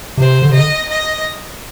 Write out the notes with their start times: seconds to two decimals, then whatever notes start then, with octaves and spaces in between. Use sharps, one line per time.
0.18 C3 C5
0.42 D3
0.50 C3
0.53 D3 D#5
0.89 D#5